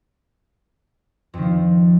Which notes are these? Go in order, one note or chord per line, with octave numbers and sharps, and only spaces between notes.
F2 D#3 F3